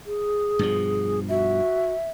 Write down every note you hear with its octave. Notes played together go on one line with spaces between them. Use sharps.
G#4
G2 B2 F3
F#4 E5